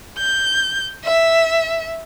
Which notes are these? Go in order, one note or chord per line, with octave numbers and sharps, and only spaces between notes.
G6
E5